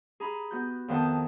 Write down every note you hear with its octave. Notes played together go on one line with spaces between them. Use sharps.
G#4 A#5 B5 D#6
B3 F#4 G6
F2 D#3 B3 C5 A5 D#6